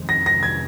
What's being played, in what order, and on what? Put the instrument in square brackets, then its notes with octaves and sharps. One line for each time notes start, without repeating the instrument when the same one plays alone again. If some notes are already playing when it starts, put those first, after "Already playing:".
Already playing: [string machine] F2 C3 D#3 G#3 C4
[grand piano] A#6
A#6
G#6